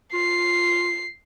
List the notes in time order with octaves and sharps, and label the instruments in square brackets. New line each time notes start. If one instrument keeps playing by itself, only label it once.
[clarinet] F4 [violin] C7